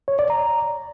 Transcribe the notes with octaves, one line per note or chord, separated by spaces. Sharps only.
C#5
D5
A#5